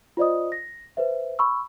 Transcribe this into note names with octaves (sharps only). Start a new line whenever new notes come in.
F4 C5 D5 D#5 D#6
A#6
B4 C5 E5
B5 C#6 E6